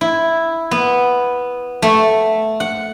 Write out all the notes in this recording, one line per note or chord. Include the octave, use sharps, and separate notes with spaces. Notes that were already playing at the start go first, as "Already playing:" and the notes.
E4
B3
A3
F#5